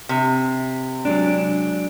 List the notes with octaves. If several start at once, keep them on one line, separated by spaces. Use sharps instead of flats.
C3
F#3 G#3 D4